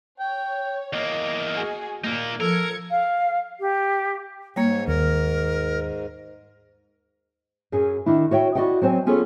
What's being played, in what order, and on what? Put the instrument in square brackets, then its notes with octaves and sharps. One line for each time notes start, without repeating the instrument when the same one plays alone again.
[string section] C#5 [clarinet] G5
[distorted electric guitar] E2 A#3 [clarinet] D#5
[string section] F#4 G#4
[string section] A#2 [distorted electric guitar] A#3 D#4
[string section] F3 G#6 C#7 [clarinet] A4 [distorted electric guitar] A#4
[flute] F5
G4
[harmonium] G#2 [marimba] G3 A#3 [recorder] C#5
[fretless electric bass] D#2 [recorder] A#4
[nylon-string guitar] F#2 F#3 C#4 G#4
D#3 D4 E4
F#4 C#5 E5 G5
E4 F#4 D5 D#5 F#5 G5
F#3 C4 C5 G#5
B3 C#4 F4 G#4 A4 C#5